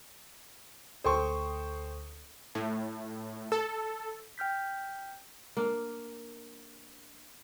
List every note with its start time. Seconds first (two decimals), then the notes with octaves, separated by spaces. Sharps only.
1.04 D2 A4 C5 G5 C#6 D#6
2.55 A2
3.52 A4
4.38 G5 F6 G6 B6
5.57 A#3 D4